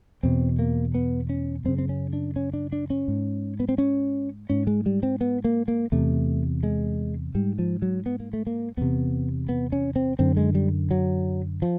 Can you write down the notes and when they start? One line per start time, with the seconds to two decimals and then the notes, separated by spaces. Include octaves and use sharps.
0.23 E2 B2 C4
0.59 A#3
0.94 B3
1.29 C#4
1.64 F#2 C#3 C4
1.78 C4
1.89 C#4
2.13 D4
2.36 C#4
2.53 D4
2.72 D4
2.90 C#4
3.08 G#2
3.60 B3
3.69 C4
3.78 C#4
4.50 G#2 C#4
4.67 G#3
4.86 G3
5.03 C4
5.21 B3
5.44 A#3
5.68 A#3
5.92 E2 C3 A3
6.63 G#3
7.35 G#2 G3
7.59 F3
7.82 F#3
8.06 B3
8.20 A#3
8.33 A3
8.47 A#3
8.77 E2 C3 B3
9.49 B3
9.72 C#4
9.96 C4
10.19 F#2 D3 C4
10.37 G#3
10.55 G3
10.91 F#3
11.62 F3